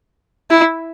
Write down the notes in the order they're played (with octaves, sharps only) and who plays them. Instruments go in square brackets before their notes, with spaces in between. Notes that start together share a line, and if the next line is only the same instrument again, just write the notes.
[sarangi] E4